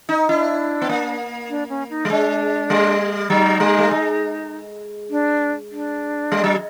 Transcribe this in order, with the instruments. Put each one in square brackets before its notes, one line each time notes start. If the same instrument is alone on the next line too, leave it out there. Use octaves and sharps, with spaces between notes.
[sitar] D#4
[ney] D4 [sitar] E4
[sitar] B3
A#3
[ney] D4
C#4
D#4
[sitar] G3
[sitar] G#3 [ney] D4
[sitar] G3
[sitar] F#3 [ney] D#4
[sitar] G3
A3
G#3
[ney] D4
D4
[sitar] G3
F#3